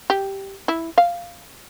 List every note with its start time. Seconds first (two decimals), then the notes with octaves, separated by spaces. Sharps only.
0.10 G4
0.68 E4
0.98 F5